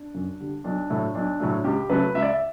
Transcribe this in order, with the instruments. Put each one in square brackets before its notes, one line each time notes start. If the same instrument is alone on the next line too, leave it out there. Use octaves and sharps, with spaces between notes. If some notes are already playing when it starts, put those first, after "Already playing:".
Already playing: [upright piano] D4
F#2
D3 G3
B1 D4
A2 F#3 A3
B1 D4
A2 F#3 A3
C#2 G4
C#3 F#3 A3 B4
C#2 E5
D5
E5